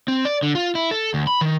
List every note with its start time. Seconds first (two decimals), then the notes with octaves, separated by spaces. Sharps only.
0.08 C4
0.25 D5
0.43 D3
0.55 F4
0.75 E4
0.91 A4
1.14 D2
1.27 B5
1.41 D#3